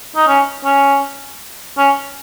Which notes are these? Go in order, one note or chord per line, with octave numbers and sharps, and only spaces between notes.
D#4
C#4
C#4
C#4